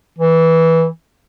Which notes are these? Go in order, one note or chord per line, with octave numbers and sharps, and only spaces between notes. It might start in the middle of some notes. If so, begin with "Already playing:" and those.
E3